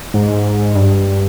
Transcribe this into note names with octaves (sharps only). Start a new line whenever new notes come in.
G#2
G2